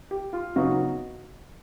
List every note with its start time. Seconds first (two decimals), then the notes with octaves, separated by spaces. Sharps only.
0.11 G4
0.33 F4
0.56 C#3 F#3 B3 D#4 F#4